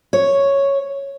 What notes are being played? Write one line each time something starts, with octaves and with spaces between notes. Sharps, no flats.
C#5